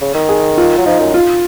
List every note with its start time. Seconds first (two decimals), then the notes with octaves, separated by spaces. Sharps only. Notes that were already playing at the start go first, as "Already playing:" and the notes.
0.01 C#3
0.14 D#3
0.29 G#4
0.58 F4
0.78 F#3
0.86 F3 D#4
1.00 F#2
1.14 F4